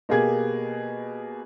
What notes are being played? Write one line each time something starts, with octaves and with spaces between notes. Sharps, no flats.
B2 A#3 G4 G#4 G#6